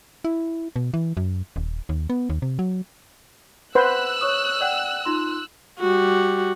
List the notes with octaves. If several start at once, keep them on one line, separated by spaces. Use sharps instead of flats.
E4
B2
E3
F#2
D#1
D#2
B3
D#2
C3
F#3
B4 C5 F#5 E6 F#6
C#5 C#6 D#6
D5 F#5 G5
D#4 F4 C6
G3 F#4